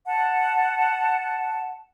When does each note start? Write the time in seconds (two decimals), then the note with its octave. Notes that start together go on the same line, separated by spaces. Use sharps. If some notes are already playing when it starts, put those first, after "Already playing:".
0.07 F#5 A5